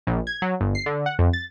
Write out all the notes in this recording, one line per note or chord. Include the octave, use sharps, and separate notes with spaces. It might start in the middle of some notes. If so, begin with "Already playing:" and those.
A#1
G#6
F#3
G1
C7
D3
F#5
F2
A6